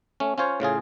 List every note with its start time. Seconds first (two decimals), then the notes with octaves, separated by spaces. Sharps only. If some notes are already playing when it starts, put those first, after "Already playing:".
0.20 A3 C#4
0.38 C#4 F4 C5 C#5
0.60 A2 C#3 F4 G#4